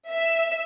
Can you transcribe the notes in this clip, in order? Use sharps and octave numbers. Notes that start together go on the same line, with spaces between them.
E5